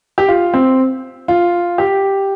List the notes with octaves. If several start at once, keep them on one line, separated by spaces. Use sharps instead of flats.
G4
F4
C4
F4
G4